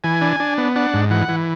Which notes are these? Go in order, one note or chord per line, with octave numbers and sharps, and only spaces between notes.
E3 G#5
D4
D4
B3
D4 F#5
G#2
E3 F#5
E3